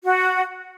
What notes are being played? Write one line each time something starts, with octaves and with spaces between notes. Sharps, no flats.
F#4